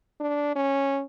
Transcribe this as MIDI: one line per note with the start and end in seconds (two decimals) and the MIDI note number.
0.20 0.54 62
0.56 1.02 61